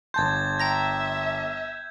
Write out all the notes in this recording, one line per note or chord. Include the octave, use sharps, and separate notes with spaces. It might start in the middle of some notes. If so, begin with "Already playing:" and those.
G1 A5 C6 G6 G#6
E5 G5 A#5 A#6